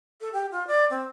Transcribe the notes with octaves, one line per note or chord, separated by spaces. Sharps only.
A4
G4
F4
D5
C4